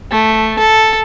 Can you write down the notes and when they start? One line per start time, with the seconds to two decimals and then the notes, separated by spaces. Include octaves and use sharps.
0.11 A3
0.59 A4